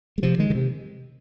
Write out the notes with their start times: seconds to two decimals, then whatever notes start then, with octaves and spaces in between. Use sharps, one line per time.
0.18 G#3
0.23 C3 F3
0.39 D#3 G#3
0.50 D#3
0.55 C3